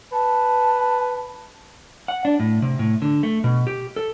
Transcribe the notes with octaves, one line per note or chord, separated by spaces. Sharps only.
B4 A5
F#5
D4
A2
C3
A2
D3
A3
B2
G4
A4